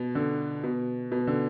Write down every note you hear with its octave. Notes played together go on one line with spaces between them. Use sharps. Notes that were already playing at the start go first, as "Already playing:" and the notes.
Already playing: B2
D3
B2
B2
D3